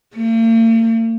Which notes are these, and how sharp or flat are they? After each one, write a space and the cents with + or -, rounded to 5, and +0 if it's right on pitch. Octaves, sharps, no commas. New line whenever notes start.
A#3 -45